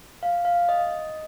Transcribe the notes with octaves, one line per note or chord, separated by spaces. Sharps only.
F5
F5
D#5